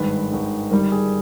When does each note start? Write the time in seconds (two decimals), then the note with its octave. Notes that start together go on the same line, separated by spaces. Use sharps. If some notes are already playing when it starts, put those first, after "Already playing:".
Already playing: G#1 G2 D#3 G#3 B4
0.30 G#1 G2 D#3 G#3
0.71 G1 G2 D#3 G3 A#4
0.92 G#4